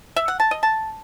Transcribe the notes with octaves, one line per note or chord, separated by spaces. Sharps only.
E5
F#5
A5
D#5
A5